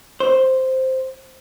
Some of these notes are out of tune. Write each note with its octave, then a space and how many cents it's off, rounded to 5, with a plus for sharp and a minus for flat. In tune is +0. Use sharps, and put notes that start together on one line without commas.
C5 +0